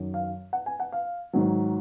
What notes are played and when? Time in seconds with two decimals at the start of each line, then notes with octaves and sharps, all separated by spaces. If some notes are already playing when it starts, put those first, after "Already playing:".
Already playing: F#2 D#3 F#3
0.14 F5
0.53 F#5
0.66 G#5
0.80 F#5
0.92 F5
1.33 G#2 D#3 F#3